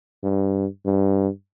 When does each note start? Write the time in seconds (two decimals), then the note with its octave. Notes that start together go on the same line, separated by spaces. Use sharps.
0.23 G2
0.85 G2